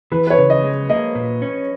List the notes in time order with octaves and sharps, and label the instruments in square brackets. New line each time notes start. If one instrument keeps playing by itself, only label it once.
[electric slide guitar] E3 [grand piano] B4
[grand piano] B4
C#5
[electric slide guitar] C#3
[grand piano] D#5
[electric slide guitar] G#3
[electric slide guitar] A#3 [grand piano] D#5
[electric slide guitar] A#2
C#4